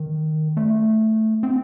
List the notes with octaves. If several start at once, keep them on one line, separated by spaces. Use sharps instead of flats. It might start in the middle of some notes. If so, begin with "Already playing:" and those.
Already playing: D#3
A3
C4